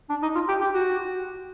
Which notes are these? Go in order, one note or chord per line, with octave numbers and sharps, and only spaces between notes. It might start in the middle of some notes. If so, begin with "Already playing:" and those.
D4
D#4
F4
G4
G4
F#4